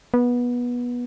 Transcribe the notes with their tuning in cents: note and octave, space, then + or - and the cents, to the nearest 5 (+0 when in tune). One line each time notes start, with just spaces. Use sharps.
B3 -20